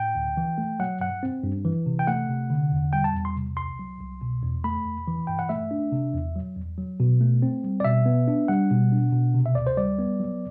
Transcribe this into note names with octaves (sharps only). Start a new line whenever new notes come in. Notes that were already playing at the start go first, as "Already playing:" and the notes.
Already playing: A2 G5
D2
E3
A3
F#3 F#5
G2 F#5
C4
G2
E3
C3
G5
A3 F#5
C3
D3
E2
G3 G5
A5
E2
C6
C3
C2 C6
F#3
C2
B2
E2
A3 B5
E2
E3
G2 G5
F#5
A3 E5
D4
C3
E2
F#3
E2
F#3
B2
A3
C4
G3
D5
B2 E5
B3
D4
G3 F#5
B2
D4
B2
C3
E5
D2 D5
C5
G3 D5
B3
F#3